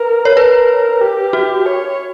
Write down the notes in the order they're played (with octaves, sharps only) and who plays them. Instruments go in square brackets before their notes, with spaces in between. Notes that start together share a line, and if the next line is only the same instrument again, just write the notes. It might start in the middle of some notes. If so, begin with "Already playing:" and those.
Already playing: [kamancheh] A#4 [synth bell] B4
[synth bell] C#5
[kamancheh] A#4 [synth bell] B4
[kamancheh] G4
[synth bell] F#4
[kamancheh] C#5